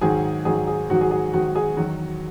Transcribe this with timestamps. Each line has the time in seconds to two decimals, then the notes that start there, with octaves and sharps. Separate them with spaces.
0.01 G#2 D#3 F#3 G#4
0.45 G#2 D#3 F#3 G#4
0.67 G#4
0.90 G#2 D#3 F#3 F#4
1.01 G#4
1.11 G#4
1.33 G#2 D#3 F#3 F#4
1.55 G#4
1.77 E2 D#3 F#3 F#4